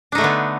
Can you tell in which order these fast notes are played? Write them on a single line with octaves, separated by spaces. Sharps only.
D4 D#4 A3 D3 B3